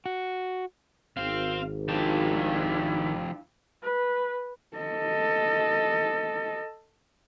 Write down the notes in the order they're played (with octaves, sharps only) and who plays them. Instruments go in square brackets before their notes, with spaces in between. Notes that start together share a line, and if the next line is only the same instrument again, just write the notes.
[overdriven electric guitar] F#4
[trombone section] G#1 [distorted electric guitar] C4 C5 [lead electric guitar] F5
[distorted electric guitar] D#3 A5 [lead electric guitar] F3 G4 [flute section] D4 E4 F5
[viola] B4
[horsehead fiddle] A4 D#5